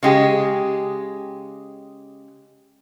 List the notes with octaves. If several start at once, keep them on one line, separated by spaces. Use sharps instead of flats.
C#3 G#3 G4